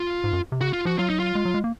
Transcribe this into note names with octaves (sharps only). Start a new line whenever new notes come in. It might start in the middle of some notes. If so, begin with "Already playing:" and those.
Already playing: F4
G#2
F#2
C3
C#3 F#4
F4
F3 F#4
F#3 F4
D#4
F4
G#3
F#3
G#3
A#3